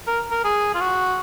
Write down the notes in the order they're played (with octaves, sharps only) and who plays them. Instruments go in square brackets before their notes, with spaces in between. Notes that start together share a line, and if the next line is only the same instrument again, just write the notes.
[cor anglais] A#4
A#4
G#4
F4
F#4